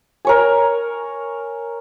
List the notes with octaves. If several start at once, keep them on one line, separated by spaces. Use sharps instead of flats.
A#4 C#5 G#5